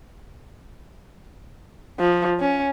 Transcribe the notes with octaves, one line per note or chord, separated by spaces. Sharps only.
F3
C#4